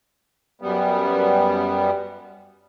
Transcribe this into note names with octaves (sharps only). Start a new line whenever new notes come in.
F#2 G3 B3